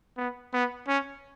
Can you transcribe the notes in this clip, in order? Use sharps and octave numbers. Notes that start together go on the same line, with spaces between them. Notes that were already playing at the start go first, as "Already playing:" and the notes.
B3
B3
C#4